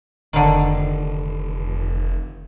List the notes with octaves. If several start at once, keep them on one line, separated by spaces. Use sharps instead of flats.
F1 D3 D#3